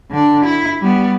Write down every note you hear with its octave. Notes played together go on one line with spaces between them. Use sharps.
D3 D4
E4
G3 B3